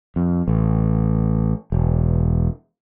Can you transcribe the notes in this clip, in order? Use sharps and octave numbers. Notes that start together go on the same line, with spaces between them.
F2
A1
E1